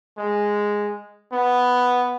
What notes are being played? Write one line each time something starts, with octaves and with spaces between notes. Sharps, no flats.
G#3
B3